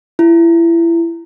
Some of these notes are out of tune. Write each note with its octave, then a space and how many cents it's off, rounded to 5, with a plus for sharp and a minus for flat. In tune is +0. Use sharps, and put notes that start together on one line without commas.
E4 +25